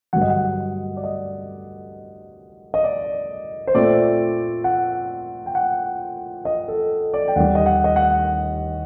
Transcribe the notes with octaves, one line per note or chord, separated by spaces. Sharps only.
G2 D3 F#3 F#5
D#5
F#5
D5
D#5
D#5
D5
C5
A#2 A3 C4 D5
F#5
G5
F#5
D#5
A4
D5
G5
D#2 D#3 G3 F#5
D#5
F#5
D#5
F#5